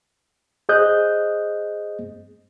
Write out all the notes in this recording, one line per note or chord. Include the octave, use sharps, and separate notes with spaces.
G#4 C5 D#5 D#6 F#6 G6